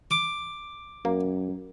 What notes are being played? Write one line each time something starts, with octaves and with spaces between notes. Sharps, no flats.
D6
F#2 A#3